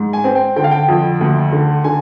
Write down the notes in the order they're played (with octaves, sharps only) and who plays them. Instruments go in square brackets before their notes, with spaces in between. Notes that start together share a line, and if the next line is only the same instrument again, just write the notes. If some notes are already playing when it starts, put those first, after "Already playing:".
Already playing: [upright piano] G#2
G#5
C4
G5
D3 G5
F5
G5
F2
D2
D3
D3 G#5